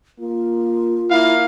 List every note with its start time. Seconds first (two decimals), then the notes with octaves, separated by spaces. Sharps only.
0.19 A#3 F4
1.10 A#3 E4 F5